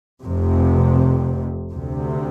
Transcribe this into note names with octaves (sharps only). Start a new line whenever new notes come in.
F1 F2 C3
D2 C3